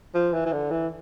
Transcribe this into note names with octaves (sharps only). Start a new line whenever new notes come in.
F3
E3
E3
D3
E3